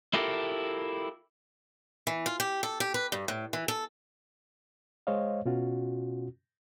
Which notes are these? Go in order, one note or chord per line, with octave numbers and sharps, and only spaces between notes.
E4 F4 G4 A4 A#4
E3
F4
G4
A4
G4
B4
G2
A2
E3
A4
G#3 C5 C#5 D#5 F5
B2 C#4 F4 F#4